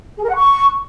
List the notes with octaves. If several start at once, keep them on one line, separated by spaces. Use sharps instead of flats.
G#4
A#4
F#5
C#6